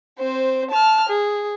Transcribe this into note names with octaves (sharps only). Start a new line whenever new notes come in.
C4 C5
A5 F6
G#4